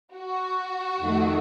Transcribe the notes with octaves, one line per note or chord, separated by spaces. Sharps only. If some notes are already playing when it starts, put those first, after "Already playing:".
F#4
F2 D#3 A3